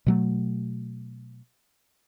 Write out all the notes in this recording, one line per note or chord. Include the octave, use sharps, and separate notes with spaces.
B2 F#3 A3